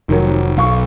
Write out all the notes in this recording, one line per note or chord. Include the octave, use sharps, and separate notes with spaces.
F1 D#3 F#3
B1 F5 C#6